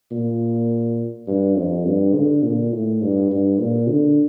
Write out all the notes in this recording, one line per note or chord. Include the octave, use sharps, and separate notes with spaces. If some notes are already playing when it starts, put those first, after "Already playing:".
A#2
G2
F2
G2
D3
A#2
A2
G2
G2
A#2
D3